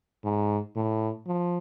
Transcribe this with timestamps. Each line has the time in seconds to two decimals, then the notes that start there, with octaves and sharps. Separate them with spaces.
0.24 G#2
0.76 A2
1.27 F3